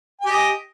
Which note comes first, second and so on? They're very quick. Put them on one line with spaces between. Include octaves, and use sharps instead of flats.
G#5 G4 D#5